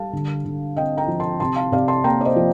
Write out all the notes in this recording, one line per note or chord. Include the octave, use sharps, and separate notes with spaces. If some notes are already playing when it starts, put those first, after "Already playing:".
Already playing: G3 F5 A5
D3
D3
C4 D#5 G5
G5 A#5
F3
A5 C6
C3 A5 C6
F5 A5
C3 D5 F5
A5 C6
A#3 G5 A#5
D5
C5 D#5
F3